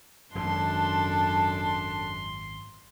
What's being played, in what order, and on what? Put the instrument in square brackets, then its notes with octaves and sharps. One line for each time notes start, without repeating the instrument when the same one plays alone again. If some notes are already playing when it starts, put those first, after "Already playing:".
[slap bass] D#1 G#1 [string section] F#2 [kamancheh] D4 A4 [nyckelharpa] C6